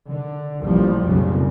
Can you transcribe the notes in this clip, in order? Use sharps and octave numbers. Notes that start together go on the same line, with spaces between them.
D3
A1 D#2 A#2 F3 G3
B1 F2 A#2 C#3 G3